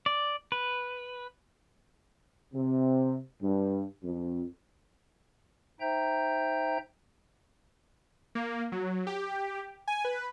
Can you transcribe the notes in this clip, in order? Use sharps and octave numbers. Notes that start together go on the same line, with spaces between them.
D5
B4
C3
G2
F2
D#4 C5 E5 G5 A#5 G6
A#3
F#3
G4
G#5
B4